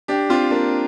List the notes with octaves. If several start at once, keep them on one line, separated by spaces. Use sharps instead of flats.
D4 G4
C4 F4
A#3 D4